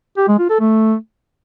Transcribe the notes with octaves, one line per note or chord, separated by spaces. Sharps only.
G4
G#3
F4
A4
A3